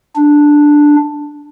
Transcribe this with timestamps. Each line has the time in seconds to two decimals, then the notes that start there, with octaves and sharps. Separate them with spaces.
0.16 D4